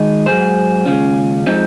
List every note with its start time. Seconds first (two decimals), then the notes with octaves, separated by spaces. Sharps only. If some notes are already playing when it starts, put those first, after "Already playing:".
Already playing: D#3 G#3 D#5
0.26 G#2 F#3 G#4 C5
0.85 D#2 C#3 G#3 C#4 F4
1.46 F3 G#3 C4 D#4